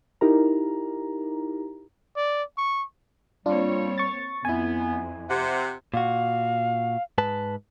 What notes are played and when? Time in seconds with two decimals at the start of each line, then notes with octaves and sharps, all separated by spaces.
0.21 D#4 E4 G4 A#4 A#5
2.17 D5
2.58 C#6
3.46 G3 A#3 C4 D4 F4 C#5
3.98 C#6 A6
4.45 F2 B3 E4 G#5
5.29 C3 E5 F#5
5.94 A#2 F#4 F5
7.18 G#2 B4 A5